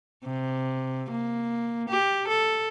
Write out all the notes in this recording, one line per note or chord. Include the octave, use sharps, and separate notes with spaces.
C3
A#3
G4
A4